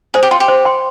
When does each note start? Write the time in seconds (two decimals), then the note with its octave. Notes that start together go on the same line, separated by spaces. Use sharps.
0.14 G#4 C5
0.23 G4
0.31 F4 G5 C6
0.40 G4
0.48 C5
0.65 G5 C6